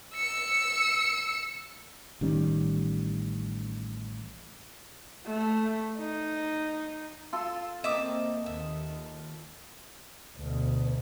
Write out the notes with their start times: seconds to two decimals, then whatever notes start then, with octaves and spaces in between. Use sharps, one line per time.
0.14 E6 C#7
2.21 A1 D#3 G3 C#4
5.26 A3
5.98 D#4
7.33 F4 A4 C6 E6
7.84 A#3 C4 D#5 E5 D6 D#6
8.46 D#2 E5
10.38 D2 B2